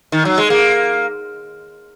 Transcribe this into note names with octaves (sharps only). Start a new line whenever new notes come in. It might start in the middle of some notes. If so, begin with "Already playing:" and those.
D#3
F#3
G#3
A#3